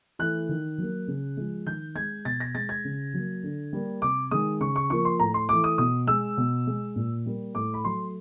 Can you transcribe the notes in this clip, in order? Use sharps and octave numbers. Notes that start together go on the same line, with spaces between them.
E3 A3 F#6
D#3
F#3 A#3
C#3
F3 G#3
D#3 G6
G#3 G#6
B2 A6
A#6
G#3 A6
G#6
C#3
F#3 A#3
D3
G3 A#3
C3 D6
D#3 G#3 D#6
C#3 C#6
C#6
F3 A#3 C#6
C6
A2 A#5
C6
E3 A3 D6
D#6
B2 D#6
G#3 E6
B2
G#3
A#2
G3 A#3
A2 D6
B5
F#3 A3 C6